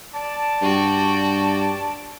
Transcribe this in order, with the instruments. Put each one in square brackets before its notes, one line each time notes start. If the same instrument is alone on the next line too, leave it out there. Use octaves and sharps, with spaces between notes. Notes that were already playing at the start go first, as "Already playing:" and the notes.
[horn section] D5 A5
[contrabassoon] G2 [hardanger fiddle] F#4 G5